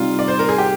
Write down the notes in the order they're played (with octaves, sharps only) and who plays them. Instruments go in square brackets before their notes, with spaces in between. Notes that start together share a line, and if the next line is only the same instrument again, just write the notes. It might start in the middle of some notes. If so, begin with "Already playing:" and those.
Already playing: [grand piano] C3 G3 C4 D#4 [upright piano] F4
[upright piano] D5
C5
A#4
G#4
G4